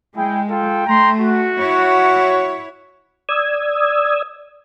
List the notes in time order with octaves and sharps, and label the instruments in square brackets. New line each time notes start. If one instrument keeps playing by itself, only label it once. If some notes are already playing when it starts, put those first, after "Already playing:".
[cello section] G#3 [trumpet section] E4 G#4 G5
[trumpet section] F4 A4 G5
[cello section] A3 [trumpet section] G5 A#5 C6
[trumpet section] F#4
[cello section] E4 C#5
[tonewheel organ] D5 D#6 E6 G#6